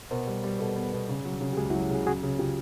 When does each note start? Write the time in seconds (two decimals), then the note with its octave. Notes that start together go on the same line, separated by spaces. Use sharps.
0.11 B2 A#4 C5
0.27 G3
0.43 G3
0.59 B2 A4 B4
0.76 B3
0.93 B2
1.09 C#3
1.25 F#3
1.41 C#3
1.53 G4
1.57 C#2 F#4 G#4
1.70 E4 F#4
1.74 F#3
1.90 C#3 F#4 G#4
2.06 C#3 F#4 G#4
2.23 C#3
2.39 C#3 F4 G4